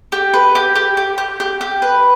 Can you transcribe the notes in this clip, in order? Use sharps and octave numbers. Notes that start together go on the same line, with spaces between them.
G4
B4
G4
G4
G4
G4
G4
G4
B4